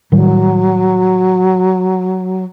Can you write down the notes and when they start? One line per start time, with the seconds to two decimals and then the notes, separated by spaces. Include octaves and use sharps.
0.12 A2 D#3 F#3 G3